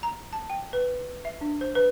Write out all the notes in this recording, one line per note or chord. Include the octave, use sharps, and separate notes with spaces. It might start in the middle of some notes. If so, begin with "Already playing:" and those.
A#5
A5
G5
B4
E5
D4
C5
B4